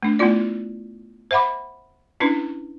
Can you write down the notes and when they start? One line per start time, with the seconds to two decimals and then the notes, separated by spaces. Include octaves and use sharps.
0.03 A3 D4
0.19 A3 B3 E4 F4 D5
1.31 C5 E5 F#5 B5 D6
2.20 C#4 D4 E4 B4